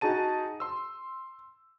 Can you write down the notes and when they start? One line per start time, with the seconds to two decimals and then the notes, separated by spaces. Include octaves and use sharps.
0.01 D#4 F#4 G#4 A5 D#7
0.60 C6 E6